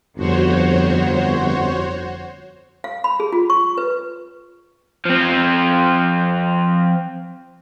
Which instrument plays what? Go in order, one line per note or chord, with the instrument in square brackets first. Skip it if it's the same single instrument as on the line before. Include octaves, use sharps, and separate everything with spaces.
[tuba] G1 [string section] F2 [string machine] F#4 C5 C#5
[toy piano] F5
B5
G#4
F4
C#6
B4
[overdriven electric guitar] F3 C4